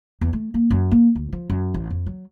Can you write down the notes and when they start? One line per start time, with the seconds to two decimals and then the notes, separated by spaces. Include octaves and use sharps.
0.21 E2
0.33 A3
0.54 A#3
0.71 F#2
0.91 A#3
1.15 D2
1.33 F3
1.50 F#2
1.74 A1
1.90 F2
2.06 F#3